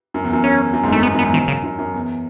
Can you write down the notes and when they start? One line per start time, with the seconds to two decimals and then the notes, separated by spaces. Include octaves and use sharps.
0.14 F#2
0.24 E2
0.33 F#2
0.44 F#2 C#4
0.73 F#2
0.83 E2 G#2
0.92 F#2 A3
1.03 E2 B3
1.14 F#2
1.19 B3
1.23 E2 G#2
1.33 F#2 D#3
1.48 C#3
1.64 F#2
1.79 F#2
1.94 E2